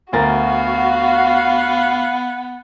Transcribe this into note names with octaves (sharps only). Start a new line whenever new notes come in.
D2 B3 F#4 A#4 F5 A6